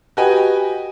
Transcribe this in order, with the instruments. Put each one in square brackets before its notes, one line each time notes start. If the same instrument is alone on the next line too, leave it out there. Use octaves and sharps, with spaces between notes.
[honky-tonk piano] F#4 G4 B4 D#5 G5 G#5